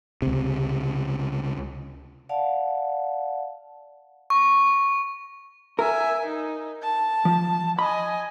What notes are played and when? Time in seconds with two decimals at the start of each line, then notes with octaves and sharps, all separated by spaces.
0.22 C#2 C3
2.29 D5 F5 F#5 A5
4.30 C#6
5.79 A#4 E5 G#5
6.25 D#4
6.82 A5
7.25 F3
7.79 D#5 G#5 B5